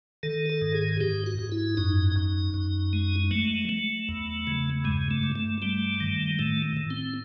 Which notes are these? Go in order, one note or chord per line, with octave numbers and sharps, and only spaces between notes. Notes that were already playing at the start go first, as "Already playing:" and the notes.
D#3 A4
A4
G#2
G#4
G#2 G4
F#4
G#2
E4
F#2 D#4
F#2
F#2
G#3
F#3 A3
F#3
E2
C#3
G2 G#3
A3
G2
A3
G3 A3
D#3
A2 A3
A2
C4